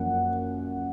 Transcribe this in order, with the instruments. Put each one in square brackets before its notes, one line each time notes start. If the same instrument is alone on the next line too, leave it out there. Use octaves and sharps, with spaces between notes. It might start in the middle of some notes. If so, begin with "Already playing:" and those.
Already playing: [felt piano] F#2 F3 A#3 F#5